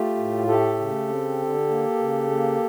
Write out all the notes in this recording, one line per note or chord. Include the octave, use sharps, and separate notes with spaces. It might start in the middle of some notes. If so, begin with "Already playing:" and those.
Already playing: A3 F4 G4
A2
A3 G4 A4
C#3
C4
D3
A#3
C#3
A#3